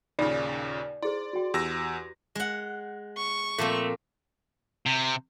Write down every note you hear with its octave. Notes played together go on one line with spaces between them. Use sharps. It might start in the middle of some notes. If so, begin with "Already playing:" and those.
D#2 A#2 C#3 D#4 D5 B5
E4 G#4 C5 D5 C6
F#4 G5
E2 G4 E6 A#6
G#3 F#5
C#6
A#2 F3 A3 C4
C3